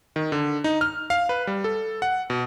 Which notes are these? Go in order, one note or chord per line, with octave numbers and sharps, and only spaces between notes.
D#3
D3
D#4
F6
F5
B4
G3
A4
F#5
B2